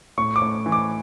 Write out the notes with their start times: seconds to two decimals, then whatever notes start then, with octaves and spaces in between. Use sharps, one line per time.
0.18 A2 C#6
0.36 D6
0.42 A2
0.66 E3
0.72 D6